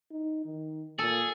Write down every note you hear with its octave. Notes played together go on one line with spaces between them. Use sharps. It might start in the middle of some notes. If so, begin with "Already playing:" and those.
D#4
D#3
A#2 G#4 A4